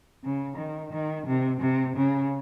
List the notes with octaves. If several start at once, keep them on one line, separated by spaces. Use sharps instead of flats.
C#3
D#3
D#3
C3
C3
C#3